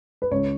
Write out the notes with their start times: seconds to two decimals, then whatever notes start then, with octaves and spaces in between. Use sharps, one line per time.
0.22 B4
0.31 C#2 C#5